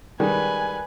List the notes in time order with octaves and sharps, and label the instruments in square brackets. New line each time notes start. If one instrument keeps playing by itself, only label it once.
[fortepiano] D#3 G3 G#3 [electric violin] B4 G#5